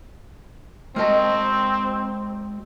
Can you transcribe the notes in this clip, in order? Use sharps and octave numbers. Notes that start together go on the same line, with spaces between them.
G#3 C4 F#4 A#4 D#5 A5